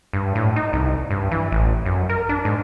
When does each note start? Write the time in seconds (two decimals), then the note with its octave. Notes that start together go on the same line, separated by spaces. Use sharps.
0.13 G2
0.35 A2
0.56 D#4
0.73 C2
1.11 G2
1.31 E3
1.52 A1
1.85 F#2
2.09 A#4
2.29 D4
2.45 G#2